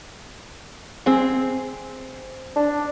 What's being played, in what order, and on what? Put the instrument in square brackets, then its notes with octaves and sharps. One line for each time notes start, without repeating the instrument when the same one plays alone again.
[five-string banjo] C4 G#4
[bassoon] D4